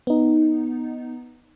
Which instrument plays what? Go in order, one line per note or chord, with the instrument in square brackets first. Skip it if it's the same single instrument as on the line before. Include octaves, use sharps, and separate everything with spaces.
[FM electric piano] B3 D#4